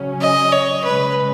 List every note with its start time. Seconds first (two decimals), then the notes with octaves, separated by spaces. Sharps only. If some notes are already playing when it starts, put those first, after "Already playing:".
Already playing: C#3 F#3 C#4
0.21 D#5
0.52 C#5
0.84 C#3 G#3 C#4 B4